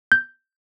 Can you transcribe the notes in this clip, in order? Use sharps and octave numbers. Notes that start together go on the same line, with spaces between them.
G6